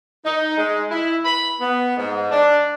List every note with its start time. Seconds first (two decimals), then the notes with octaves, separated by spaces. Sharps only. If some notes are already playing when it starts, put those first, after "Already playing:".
0.25 D#4
0.58 G#3
0.91 E4
1.25 B5
1.61 B3
1.97 G#2
2.31 D4